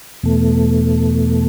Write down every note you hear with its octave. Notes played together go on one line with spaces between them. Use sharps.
E2 B2 A3